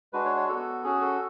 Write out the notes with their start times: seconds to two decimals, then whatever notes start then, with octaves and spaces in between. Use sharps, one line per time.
0.13 G#3 D4 F#4 B4
0.25 C#5
0.37 C#5
0.49 B3 F#4 A4
0.84 C#4 F#4 G#4
1.01 A4